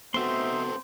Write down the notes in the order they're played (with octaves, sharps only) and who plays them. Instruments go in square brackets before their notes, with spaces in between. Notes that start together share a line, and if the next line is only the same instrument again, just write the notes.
[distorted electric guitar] A3 C4 [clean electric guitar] B3 F#4 [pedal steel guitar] D#4 E5 C6 [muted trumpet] C5